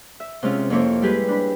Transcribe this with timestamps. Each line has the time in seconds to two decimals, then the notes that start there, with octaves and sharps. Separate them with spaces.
0.20 E5
0.43 C3 G#3 C#4 F4
0.70 F2 A#3 E4 C#5 D6
1.02 G3 G#3 G4 G#4 B4
1.28 D4 B5